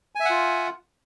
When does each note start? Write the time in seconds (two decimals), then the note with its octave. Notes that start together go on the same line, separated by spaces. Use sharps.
0.15 G#5
0.20 E5
0.25 F#5
0.30 F4